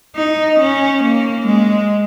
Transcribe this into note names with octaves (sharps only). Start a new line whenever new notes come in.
D#4
C#4
A#3
G#3